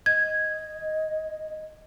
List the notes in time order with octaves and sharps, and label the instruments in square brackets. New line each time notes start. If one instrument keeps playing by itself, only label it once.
[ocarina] D#5 [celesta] G#6